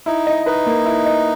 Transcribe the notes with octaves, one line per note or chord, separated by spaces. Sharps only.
D#4 E4
D#5
D#4 B4
A#3
E4
D#5